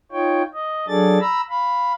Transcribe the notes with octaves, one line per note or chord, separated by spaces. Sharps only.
D#4 F4 C#5 G5
D#5
F#3 D4 G#4 A4 D5 A6
A#5 B5 E6
F5 B5